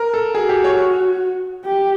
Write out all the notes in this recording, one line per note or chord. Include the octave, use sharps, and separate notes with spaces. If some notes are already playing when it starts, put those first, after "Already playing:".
Already playing: A#4
A4
F#4 G#4
G4
C#5
G4